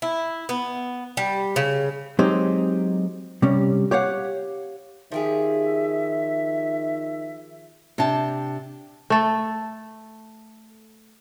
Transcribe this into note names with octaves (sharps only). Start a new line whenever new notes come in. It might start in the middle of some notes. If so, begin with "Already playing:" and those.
E4
B3
G3
C#3
F#3 G#3 C4 D#4 G4 C5
C3 G3 C#4
G4 C#5 F5 F#5
D#3 F3 G4 G#4 E5
C3 D4 G5 A5
A3 A4